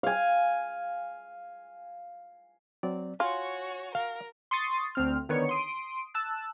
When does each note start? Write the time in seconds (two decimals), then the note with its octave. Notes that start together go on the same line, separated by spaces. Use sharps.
0.03 F5 G#5
2.83 F#3 C4 D5
3.20 F4 F#4 C#5 G#5
3.95 A#4 F5
4.51 C6 C#6 D#6 A6
4.95 D2 C4 F6
5.29 D3 D#3 B3 C#5 C#7
5.49 C6 D#6 D7
6.14 A5 E6 F#6